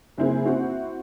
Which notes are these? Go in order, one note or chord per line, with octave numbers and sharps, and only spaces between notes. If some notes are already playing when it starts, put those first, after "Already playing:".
F#1 C4 E4 G#4
C4 E4 F#4